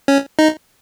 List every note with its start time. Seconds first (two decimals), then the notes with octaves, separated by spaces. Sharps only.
0.08 C#4
0.39 D#4